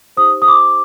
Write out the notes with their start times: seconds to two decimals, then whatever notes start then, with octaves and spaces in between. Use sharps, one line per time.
0.17 D#4 G4 C5 D#6
0.42 D#6
0.48 D6